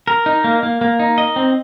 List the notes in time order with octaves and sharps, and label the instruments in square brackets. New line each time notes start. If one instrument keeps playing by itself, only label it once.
[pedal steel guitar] A#4
D#4
A#3
A#3
A#3
D#4
D#5
C4